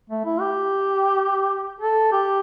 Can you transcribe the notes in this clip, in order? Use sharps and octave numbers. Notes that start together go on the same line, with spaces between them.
A3
E4
G4
A4
G4